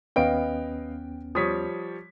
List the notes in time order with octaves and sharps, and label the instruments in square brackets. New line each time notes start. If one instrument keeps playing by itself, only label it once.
[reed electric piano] D#2 B3 C#4 [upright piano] B4 D#5 F5 [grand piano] G5 D7
[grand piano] F3 G3 C#5 [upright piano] D#6 B6